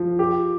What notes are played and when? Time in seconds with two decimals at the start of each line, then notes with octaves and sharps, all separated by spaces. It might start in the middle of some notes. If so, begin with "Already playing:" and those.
Already playing: F3
0.19 G4